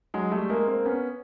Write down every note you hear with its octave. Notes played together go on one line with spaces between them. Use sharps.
F#3 G#3
G3 A3
G#3 A#3
A#3 C4
B3 C#4